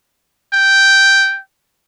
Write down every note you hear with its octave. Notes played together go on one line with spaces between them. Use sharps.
G5